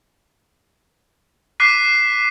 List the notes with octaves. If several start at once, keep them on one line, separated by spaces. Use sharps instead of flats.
D6 F#6 B6 C7 D#7